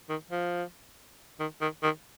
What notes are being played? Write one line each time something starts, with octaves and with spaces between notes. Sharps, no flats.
D#3
F3
D#3
D#3
D#3